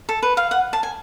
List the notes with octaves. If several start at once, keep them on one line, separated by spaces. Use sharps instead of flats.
A4
B4
F5
F#5
A5
G#5